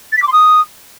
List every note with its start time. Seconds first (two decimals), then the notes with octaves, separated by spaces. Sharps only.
0.12 A6
0.17 B6
0.22 D6
0.27 C6
0.32 D#6